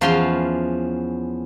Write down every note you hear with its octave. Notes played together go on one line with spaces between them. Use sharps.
E2 F3 C#4 F5 C6